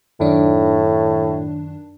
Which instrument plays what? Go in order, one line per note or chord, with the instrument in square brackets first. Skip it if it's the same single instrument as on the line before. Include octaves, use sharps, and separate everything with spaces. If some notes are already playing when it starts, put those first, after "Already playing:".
[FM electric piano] F#2 D#3 D4 [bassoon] A2